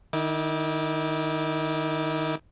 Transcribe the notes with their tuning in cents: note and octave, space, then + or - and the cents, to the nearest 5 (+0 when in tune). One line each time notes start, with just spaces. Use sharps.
D#3 -15 E4 -40 D6 +0